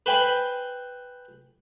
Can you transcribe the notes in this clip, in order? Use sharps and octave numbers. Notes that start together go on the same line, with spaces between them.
B4 C5 G5 G#5 B5